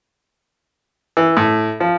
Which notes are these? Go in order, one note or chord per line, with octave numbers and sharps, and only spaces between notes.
E3
A2
F3